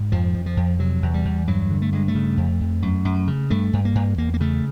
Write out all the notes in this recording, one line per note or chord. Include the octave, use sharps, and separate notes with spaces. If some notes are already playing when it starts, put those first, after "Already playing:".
Already playing: G#2
F2 F3
F2
F3
F2
C3 F#3
E2
G3
E2
G2 F#3
D3
A3
G2 G#3
A3
C#3
F2
F2
F#2
F#2
C#3
G2 A3
G2
A#3
G2
E2 A#3
A#3
C#3 A3